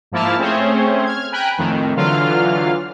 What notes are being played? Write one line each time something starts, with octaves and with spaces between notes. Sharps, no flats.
G#2 F3 A#3 E4 A5 F6
A3 C4 C#4 G#4 C5 C#5
F6 G#6
G5 G#5 A#5 B5 F#6 D7
F2 A2 D#3
D3 E3 F#3 F4 F5 F6